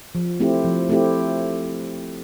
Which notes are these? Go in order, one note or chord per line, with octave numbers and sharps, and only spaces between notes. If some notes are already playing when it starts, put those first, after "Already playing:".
F3
A3 C4 E4 G4
F3
A3 C4 E4 G4